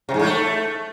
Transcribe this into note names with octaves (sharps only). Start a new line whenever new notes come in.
C3
G#2
A2
A3